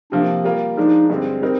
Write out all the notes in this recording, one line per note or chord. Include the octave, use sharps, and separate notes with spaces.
C3 F3 A#3 D4
G3 A#3 F4 A#4
F3 G#3 D4 D#4
G2 D3 G#3 C4
G3 C4 D#4 A#4